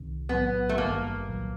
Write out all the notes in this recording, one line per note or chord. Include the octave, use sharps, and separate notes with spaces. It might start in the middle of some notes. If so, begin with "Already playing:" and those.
Already playing: C2 C3 D#3
B1 A2 F#3 B3
A3
G#1 G2 D#3 G3 A#3
C2 A#2 F#3